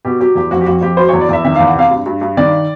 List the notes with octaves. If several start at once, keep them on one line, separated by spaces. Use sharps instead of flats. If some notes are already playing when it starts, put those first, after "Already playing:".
B2 G4
F#3 G4
E2 G4
F2 F#4
G4
F2 F#4
F2 G4
F#3 C5
E2 C#5
D5
E2 E5
D#3 E5
E2 F5
F#5
C3 F5
G2
G2
G2
D#3 D5